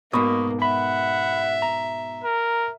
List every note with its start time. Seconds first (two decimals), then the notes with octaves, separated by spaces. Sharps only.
0.13 G#2 B2 A#3 B5 C#6 D#6
0.62 E5 F#5 B5
1.62 A#5
2.24 A#4